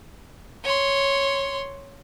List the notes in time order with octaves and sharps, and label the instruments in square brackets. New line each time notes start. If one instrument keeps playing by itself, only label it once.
[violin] C#5 C6